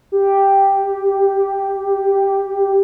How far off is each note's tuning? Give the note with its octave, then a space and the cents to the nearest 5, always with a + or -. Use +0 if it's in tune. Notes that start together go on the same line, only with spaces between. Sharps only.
G4 +0